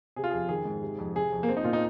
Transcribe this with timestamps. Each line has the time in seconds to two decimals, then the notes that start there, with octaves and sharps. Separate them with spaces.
0.16 C3 G#4
0.24 F4
0.30 F2 G#4
0.49 D#3 G#4
0.65 G#2
0.82 C3
0.99 F2
1.15 C3 G#4
1.32 F2
1.43 A#3
1.48 F3 C4
1.57 D#4
1.64 A#2 F4
1.73 D#4